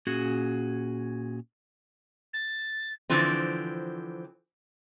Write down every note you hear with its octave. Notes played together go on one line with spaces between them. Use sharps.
A#2 C#4 F#4 G#4
A6
D3 E3 F3 C4